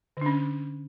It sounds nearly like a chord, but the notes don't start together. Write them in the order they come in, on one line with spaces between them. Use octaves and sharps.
D3 D4 C#4